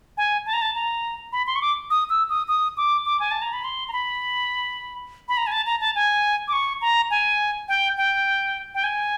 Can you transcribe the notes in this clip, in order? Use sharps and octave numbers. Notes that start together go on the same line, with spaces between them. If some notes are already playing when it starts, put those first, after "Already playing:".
G#5
A5
A#5
A5
A#5
B5
C6
C#6
D6
D#6
E6
D#6
D#6
D6
D6
G#5
A5
A#5
B5
C6
A#5
B5
B5
A#5
G#5
A5
A#5
A5
G#5
D6
C#6
A#5
G#5
G5
G5
G5
G#5